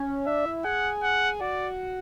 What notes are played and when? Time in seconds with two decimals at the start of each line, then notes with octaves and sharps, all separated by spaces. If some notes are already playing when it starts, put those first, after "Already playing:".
Already playing: C#4
0.26 D4 E5
0.46 E4
0.65 G#4 F#5
1.03 F#5
1.41 F#4 D5